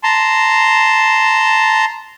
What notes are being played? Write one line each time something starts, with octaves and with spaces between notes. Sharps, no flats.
A5 A#5 C6